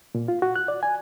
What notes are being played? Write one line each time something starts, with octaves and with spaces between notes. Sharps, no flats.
A#2
F4
F#4
F#6
D5
G#5